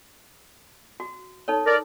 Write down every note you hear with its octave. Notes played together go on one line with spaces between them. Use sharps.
F#4
D#4 A4 C#5
A#4 D5